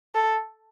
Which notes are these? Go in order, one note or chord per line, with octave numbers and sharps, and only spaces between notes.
A4